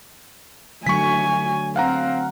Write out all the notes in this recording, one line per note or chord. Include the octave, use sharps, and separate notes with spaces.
D3 F#3 A3 G#5 C#6 B6
C4 F5 F#5 A#5